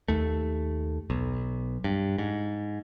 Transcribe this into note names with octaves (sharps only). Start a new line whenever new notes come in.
D#2 A3
B1
G2
G#2